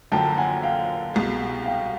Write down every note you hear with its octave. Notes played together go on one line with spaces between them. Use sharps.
F#1 F#2 D3 F3 A#3 G5 A5
F#5 G#5
F5 G5
C2 B2 G#3
F5 G5